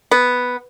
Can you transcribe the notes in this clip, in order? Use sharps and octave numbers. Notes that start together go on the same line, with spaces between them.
B3